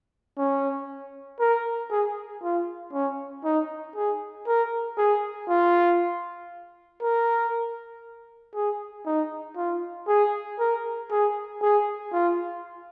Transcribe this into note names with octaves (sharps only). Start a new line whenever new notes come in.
C#4
A#4
G#4
F4
C#4
D#4
G#4
A#4
G#4
F4
A#4
G#4
D#4
F4
G#4
A#4
G#4
G#4
F4